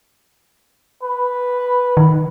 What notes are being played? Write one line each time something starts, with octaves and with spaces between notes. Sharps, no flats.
B4
D#3